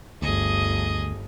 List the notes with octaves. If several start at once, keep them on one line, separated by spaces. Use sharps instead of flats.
G1 D2 G#4 D#5